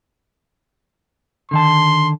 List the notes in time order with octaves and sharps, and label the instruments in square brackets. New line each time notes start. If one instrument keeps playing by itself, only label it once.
[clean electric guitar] D3 D#3 A5 [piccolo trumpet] C6